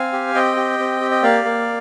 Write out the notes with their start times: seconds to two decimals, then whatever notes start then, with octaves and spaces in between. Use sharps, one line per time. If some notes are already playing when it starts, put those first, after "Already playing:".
Already playing: C4 F5 G#5
0.13 G4
0.34 C4 D#5 G5
0.56 G4
0.79 C4
1.01 G4
1.11 D#5
1.22 A#3 D5 F5
1.45 A#3